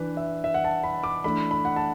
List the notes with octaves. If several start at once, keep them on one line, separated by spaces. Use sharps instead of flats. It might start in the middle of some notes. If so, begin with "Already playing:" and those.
Already playing: E3 D4 B4
E5
E5
F#5
A5
B5
D6
E3 A3 D4 B5
B5
F#5
A5